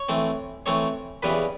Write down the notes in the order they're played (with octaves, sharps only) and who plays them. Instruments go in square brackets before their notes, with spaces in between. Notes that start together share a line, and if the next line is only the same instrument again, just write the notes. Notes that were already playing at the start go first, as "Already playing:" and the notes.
Already playing: [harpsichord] C#5 C#6
E3 A3 C4
E3 A3 C4 C#5 C#6
E2 C#3 E3 G3 B4 B5